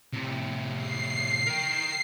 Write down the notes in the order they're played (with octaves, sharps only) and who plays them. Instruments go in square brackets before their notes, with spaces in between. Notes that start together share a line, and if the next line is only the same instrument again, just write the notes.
[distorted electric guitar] A2 C3
[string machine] C7
[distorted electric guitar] A#4 G5